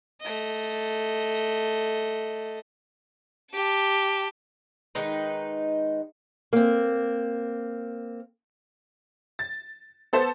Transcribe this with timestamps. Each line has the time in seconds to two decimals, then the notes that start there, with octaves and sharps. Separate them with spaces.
0.21 A3 D#5
3.52 G4 A5
4.95 D#3 G#3 D#4 B4
6.53 A#3 C4
9.39 A6
10.13 B3 A4 C5